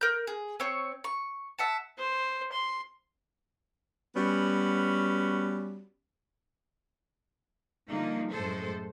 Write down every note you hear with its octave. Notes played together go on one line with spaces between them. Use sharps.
A#4 G6
G#4
C4 C#5
C#6
E5 F#5 A5
C5
C6
G3 B3 C#4 F#4
D3 F3 G3 A#3 D#4
F#2 A2 G#3 A4 C5